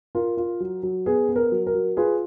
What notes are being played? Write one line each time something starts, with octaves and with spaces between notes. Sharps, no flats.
F4 A#4
F4
F#3
F#3
B3 G#4
B3
A#4
F#3
A#4
F#3
F4 G#4 B4